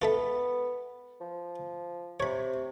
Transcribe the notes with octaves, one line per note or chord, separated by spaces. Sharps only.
B3 F4 A4 E5
F3
C3 C#5 B5